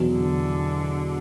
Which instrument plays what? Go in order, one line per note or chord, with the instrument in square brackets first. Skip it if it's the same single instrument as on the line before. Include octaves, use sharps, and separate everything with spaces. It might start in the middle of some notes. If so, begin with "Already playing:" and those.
Already playing: [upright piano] E2 B2 F#3
[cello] D3